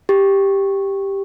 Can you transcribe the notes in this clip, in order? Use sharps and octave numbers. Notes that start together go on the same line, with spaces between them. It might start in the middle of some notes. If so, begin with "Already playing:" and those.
G4